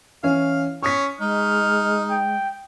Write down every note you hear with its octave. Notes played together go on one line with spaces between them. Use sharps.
E3 C#4 F5
C#4 C#6 D#6 B6
G#3 D#4 F6
G5